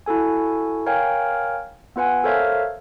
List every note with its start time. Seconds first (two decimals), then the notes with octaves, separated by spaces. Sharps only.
0.06 E4 F#4 A4 G#5
0.86 A#4 C#5 F5 G5 G#5
1.96 B3 F4 B4 F#5 G#5
2.24 A4 A#4 C5 C#5 E5 F5